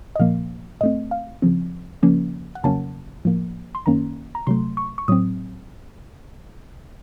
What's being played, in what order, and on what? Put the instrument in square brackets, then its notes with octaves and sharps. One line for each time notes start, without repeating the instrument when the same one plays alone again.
[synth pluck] D#5
A#2 F3 A#3 F5
A2 A3 C4 D#5
F5
C#3 F3 C4
C#3 F3 A#3 C#4
F#5
F2 C#3 F#3 A#3 C#4 A5
A2 F3 A#3
C6
F#2 D#3 A#3 C#4 A#5
A#5
C3 F#3 A3 C6
C#6
C#6
A2 F#3 C4 D#6